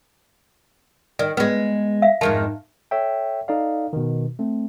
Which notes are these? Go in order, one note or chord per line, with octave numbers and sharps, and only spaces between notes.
D#3 D5
G#3 B3 B4
E5 F5
F2 G#2 D#3 A5
A4 C#5 E5 G5
D#4 A4 D5 F5
B2 D#3
A3 C4